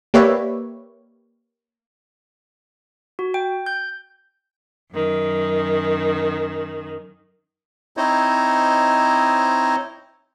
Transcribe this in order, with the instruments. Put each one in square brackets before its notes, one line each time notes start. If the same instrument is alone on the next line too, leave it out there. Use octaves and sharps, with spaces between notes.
[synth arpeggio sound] A#3 G4 B4 C#5 D5 E5
[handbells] F#4
G5
G6
[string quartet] F#2 D#3
[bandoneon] C4 D#4 E4 C5 C#5 D#5